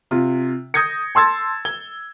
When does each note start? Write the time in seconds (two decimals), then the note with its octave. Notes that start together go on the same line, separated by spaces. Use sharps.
0.11 C3 F4
0.74 D#6 G6 G#6 A#6 C#7
1.15 A5 C6 E6 G#6 A6
1.65 G#6 G7